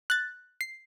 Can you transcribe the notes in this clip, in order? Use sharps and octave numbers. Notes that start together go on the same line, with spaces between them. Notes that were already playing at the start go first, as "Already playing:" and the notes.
F#6 A6
C7